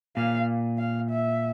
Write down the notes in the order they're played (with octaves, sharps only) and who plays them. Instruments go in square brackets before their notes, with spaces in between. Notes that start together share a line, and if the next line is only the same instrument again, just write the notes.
[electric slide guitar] A#2 [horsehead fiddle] F5
[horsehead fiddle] F5
E5